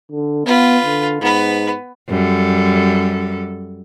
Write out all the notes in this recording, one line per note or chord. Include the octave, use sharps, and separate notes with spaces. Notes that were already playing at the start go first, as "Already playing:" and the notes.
D3
B3 F4 B4
D3
G#2 B3 B4
F#2 G3 A4